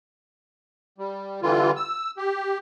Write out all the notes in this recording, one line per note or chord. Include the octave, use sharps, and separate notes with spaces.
G3
D3 E3 G3 F4
E6
G4